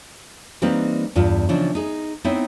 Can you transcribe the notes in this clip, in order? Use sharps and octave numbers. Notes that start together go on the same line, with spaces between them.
E3 G3 A#3 C4 D#4 B4
E2 G2 F4
C#3 E3 F3 D4 D#4
D#4 G#4
B3 C4 D#4 E4 C#5 E5